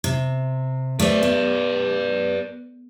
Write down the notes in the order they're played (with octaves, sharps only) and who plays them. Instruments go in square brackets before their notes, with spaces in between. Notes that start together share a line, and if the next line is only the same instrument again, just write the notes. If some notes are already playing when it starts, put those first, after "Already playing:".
[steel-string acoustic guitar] C3
[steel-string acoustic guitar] A3 C4 [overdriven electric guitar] B4 D5
[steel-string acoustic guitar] B3